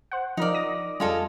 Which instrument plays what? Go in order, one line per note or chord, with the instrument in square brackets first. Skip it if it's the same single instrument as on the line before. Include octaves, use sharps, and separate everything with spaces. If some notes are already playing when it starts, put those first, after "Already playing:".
[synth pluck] C5 F#5
[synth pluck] F3 A#4 [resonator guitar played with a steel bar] D#4 D5
[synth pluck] D#6 A#6
[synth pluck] F2 G3 [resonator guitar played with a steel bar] G#3 F4 A4